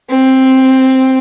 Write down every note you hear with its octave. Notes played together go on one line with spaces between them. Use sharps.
C4